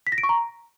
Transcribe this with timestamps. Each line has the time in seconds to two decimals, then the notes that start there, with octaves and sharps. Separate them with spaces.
0.07 B6
0.12 A#6
0.18 D7
0.23 C#6
0.29 A#5